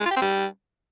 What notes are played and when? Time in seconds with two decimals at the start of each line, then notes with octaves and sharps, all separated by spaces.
0.01 G#3
0.06 F4
0.11 G4
0.16 C4
0.22 G3